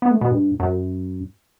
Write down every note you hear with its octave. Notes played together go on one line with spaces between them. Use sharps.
B3
A3
B2
G2
F#2